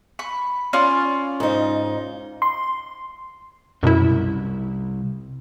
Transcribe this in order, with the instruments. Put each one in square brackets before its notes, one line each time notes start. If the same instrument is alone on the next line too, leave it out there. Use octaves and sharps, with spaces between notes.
[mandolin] B5 C#6
C#4 F4 D5
[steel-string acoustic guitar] G#2 D#4
[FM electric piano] C6
[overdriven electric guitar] C2 [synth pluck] F#2 B2 E4